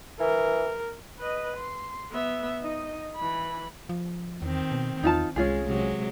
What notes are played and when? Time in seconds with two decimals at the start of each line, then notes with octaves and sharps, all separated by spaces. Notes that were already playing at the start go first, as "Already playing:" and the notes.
0.20 E3 A#4
1.19 B4 D#5
1.57 C6
2.11 B3 E5
2.61 D#4 D#5
3.16 E3 B5
3.89 F3
4.42 E2 D#3 C4
4.72 B2
5.03 E2 D#4 F4 A5
5.36 C2 G#3 C#4 F4 G#4
5.66 C3 F#3 G#3